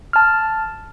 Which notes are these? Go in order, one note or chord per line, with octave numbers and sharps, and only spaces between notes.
A5 F6